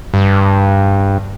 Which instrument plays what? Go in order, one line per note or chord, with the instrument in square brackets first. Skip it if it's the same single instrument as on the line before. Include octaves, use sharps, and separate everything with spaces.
[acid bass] G2